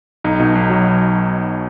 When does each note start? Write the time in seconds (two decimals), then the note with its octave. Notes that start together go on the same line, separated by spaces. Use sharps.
0.24 B1 D#4
0.40 B2
0.55 B1
0.70 F#3